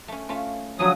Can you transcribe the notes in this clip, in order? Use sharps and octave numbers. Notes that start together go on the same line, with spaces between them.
A3 C#4
A3 C#4 F4
D3 F3 F#3 G#4 D#6